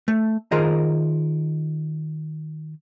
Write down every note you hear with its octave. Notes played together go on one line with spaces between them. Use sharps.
A3
D#3 F4 G#4 A#4 C5 D#5